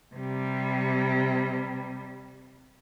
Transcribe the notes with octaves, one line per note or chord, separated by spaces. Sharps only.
C3 G3